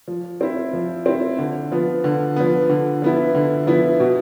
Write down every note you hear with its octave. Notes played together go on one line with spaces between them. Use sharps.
F3
C4 E4
F3
C4 E4
D3
F3 B3
D3
F3 B3
D3
F3 B3 E4
D3
F3 B3 E4
B2